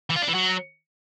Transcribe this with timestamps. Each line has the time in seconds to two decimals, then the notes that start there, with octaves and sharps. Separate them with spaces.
0.10 E3
0.16 F4
0.22 D4
0.28 E3
0.34 F#3